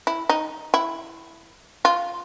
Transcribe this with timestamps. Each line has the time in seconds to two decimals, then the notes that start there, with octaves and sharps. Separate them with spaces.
0.07 E4
0.29 D#4
0.74 E4
1.85 F4